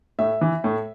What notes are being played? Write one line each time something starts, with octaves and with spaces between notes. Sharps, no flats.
A2 E5
E3
A2